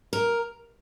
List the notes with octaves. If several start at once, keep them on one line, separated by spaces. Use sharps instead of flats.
A#4